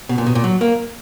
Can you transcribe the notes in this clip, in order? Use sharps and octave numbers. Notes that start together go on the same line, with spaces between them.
B2
A#2
B2
A#2
F#3
A#3